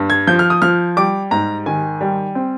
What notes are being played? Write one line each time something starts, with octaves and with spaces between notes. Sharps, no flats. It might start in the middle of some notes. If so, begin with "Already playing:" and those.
Already playing: G2
G#6
F3 G6
F6
D#6
F3 F6
G3 D6
G#2 A#5
D#3 G#5
G3
C4